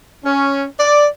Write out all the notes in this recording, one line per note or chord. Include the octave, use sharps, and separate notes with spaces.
C#4
D5